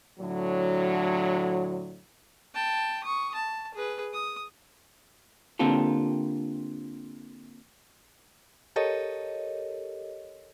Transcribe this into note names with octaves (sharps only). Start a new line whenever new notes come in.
A2 D3 F#3
G5 A5
C#6 D#6
A5
G#4 B4
D#6
D3 A#3 C4 F4 G4 A4
G4 A4 A#4 C#5 D#5